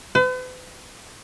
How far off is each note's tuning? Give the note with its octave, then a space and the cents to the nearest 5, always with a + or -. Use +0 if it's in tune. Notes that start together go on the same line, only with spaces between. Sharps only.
B4 +45